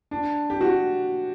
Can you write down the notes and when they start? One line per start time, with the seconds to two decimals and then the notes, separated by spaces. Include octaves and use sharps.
0.11 D4
0.50 G4
0.61 F#4